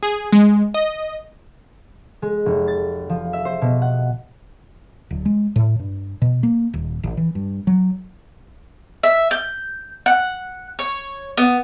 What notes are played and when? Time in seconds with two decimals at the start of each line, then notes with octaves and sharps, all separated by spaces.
0.03 G#4
0.32 G#3
0.74 D#5
2.22 G#3
2.46 F1
2.68 A6
3.10 F3
3.33 E5
3.45 C5
3.62 B2
3.82 F#5
5.11 D1
5.25 G#3
5.56 A2
5.79 G2
6.22 B2
6.43 A#3
6.74 D#1
7.03 A1
7.17 E3
7.35 G2
7.67 F#3
9.03 E5
9.31 G6
10.06 F#5
10.79 C#5
11.37 B3